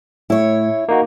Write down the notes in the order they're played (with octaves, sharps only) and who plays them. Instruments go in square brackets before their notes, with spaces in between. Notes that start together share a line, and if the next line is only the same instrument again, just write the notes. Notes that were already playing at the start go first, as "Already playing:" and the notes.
[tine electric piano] A2 [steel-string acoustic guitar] E4 C#5
[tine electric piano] A#3 D#4 F#4